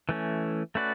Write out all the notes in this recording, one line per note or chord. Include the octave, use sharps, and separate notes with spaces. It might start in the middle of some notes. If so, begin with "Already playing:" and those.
E3 A3 C#4
A3 C#4 F#4 B4 D5